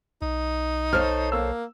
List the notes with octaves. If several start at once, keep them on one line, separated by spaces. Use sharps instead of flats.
B1 D#4
A4 C5 C#5 F6
A#3 E6